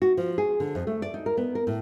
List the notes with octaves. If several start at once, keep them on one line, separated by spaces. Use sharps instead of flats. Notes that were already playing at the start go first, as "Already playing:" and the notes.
F#4
F3
G#4
D3
F2
A3
D5
D#4
A#4
B3
A#4
A2